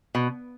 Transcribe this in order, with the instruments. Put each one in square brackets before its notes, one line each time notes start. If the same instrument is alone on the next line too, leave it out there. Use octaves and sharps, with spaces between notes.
[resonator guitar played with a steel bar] B2